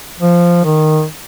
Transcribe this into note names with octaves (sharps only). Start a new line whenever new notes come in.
F3
D#3